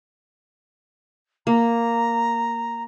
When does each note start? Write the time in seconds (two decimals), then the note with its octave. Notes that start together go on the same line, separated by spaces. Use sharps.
1.47 A#3 A#5